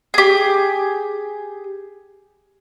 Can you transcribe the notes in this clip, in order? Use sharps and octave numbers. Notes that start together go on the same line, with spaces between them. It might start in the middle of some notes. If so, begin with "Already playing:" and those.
G4 G#4